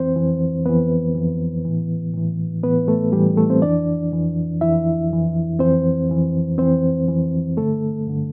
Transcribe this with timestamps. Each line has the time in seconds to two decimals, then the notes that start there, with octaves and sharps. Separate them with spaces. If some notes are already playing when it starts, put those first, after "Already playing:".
Already playing: F2 E3 C4 C5
0.16 F2 E3
0.65 F2 E3 B3 B4
1.15 F2 E3
1.65 A2 E3
2.14 A2 E3
2.63 A2 E3 B3 B4
2.88 A3 A4
3.12 A2 E3 G3 G4
3.37 A3 A4
3.50 C4 C5
3.62 F2 E3 D4 D5
4.12 F2 E3
4.61 F2 E3 E4 E5
5.10 F2 E3
5.59 F2 E3 C4 C5
6.09 F2 E3
6.58 F2 E3 C4 C5
7.08 F2 E3
7.57 G2 D3 A3 A4
8.07 G2 D3